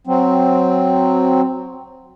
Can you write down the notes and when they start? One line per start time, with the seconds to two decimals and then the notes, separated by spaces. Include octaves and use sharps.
0.07 F#3 C4